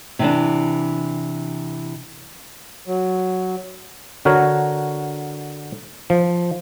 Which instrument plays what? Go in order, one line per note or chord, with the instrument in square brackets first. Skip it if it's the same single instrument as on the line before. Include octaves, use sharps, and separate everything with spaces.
[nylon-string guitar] C3 E3 D4
[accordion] F#3
[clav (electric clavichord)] D3 F#4 A#4 C#5
F3